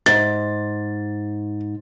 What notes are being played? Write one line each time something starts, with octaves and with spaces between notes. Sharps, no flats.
G#2 A6